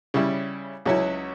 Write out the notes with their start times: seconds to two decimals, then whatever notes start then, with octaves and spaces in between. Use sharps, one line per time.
0.14 C#3 G3 C#4 E4
0.86 C#2 C#3 F#3 C#4 E4